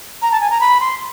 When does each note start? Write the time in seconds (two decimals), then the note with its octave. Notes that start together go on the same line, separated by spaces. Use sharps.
0.22 A#5
0.32 A5
0.41 G#5
0.50 A#5
0.61 B5
0.80 C6